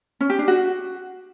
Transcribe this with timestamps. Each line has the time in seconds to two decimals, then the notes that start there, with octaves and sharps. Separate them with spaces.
0.21 C#4
0.30 G4
0.39 D4
0.48 F#4